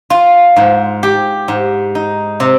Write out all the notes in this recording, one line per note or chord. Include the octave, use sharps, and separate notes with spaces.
F4
G#2
G4
G#2
D#4
C3